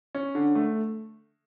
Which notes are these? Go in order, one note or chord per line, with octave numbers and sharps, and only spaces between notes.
C#4
D3
A3